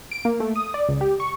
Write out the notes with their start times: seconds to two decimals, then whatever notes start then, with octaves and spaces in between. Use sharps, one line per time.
0.12 D7
0.25 A#3
0.40 A3
0.56 D#6
0.74 D5
0.89 C#2
1.01 G4
1.20 C#6